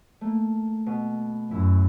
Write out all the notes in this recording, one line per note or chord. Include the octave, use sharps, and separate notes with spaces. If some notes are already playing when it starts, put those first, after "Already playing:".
A3 A#3
B2
F#2 E4